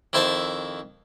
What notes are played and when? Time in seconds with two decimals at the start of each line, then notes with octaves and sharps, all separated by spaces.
0.13 F2 D#3 E4 C5 E5 A5